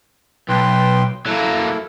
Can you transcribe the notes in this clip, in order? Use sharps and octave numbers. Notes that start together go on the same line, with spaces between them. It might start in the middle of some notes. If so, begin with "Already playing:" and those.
B1 B4 G5 C6
F#3 A#3 E4 A4